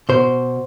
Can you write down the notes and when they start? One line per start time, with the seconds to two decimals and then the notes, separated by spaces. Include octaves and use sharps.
0.09 B2 C5